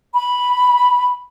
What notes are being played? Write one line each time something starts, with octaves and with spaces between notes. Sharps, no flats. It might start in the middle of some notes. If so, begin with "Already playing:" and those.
B5